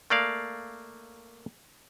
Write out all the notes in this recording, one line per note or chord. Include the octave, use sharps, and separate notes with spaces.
A3 A#3 D5 F5